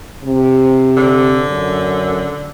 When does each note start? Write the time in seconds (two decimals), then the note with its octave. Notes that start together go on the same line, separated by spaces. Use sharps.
0.24 C3
0.96 D3
1.48 F#2